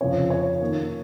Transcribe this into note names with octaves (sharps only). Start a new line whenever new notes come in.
F2 C#3 F3 C4 C#5
C#5
D#3 A#3 D#4